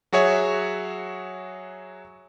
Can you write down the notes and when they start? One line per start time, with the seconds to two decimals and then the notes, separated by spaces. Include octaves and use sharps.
0.12 F#3 F#4 G#4 C#5 E5